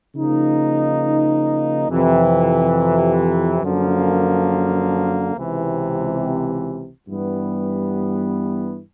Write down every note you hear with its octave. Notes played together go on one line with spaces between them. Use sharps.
C#3 F3 A#3 D#4
F2 C3 E3
F#2 D3 F3 A#3
C#2 C3 E3
G2 E3 G3 B3